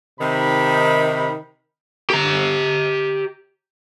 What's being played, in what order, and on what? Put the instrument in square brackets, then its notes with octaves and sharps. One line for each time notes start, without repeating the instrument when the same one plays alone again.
[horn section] C3 D#3 B5
[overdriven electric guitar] G4 A#5